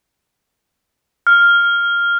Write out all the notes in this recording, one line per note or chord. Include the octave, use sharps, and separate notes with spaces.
F6